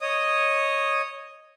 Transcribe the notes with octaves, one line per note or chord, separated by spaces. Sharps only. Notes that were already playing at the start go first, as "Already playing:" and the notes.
C#5 D#5 D#6